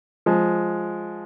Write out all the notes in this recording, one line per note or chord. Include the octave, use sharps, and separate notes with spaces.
F3 G#3